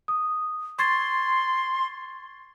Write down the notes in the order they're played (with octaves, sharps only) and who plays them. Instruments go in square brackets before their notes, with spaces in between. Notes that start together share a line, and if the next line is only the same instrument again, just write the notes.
[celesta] D#6
[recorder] C6 [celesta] C#6 G#6 A6